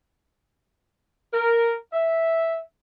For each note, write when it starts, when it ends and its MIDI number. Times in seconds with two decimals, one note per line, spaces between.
1.34 1.74 70
1.93 2.59 76